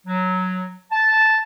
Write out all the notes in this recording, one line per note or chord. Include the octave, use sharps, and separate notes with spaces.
F#3
A5